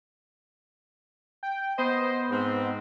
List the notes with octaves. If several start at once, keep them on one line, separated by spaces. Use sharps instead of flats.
G5
B3 C5 D#5
G#2 C4